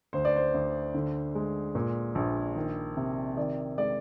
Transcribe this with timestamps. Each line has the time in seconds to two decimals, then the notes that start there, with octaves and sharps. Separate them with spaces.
0.13 D2 C5
0.25 D5
0.36 C5
0.54 D2
0.95 D3
1.35 G#3
1.75 A#2
2.15 A#1
2.56 D#3
2.97 C3
3.37 D#3 D5
3.78 G#3 D5